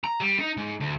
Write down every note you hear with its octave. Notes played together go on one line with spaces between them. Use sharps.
A#5
G3
D#4
G#2
D2